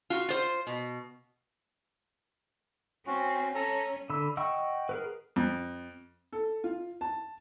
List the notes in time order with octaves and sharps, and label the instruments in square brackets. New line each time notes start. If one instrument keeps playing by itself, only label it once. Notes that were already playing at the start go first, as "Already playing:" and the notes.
[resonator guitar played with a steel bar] F4 F#4
F4 C5
B2
[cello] C4 [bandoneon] C#4 F#4
[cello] C#4 [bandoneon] A4 A#5
[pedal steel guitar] D3 B5 E6
D#5 F#5 G5 C#6 E6
G#4 A#4 B4
[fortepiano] F2
[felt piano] A4
F4
A5